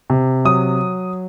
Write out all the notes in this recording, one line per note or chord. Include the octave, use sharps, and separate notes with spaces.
C3
F#3 D#6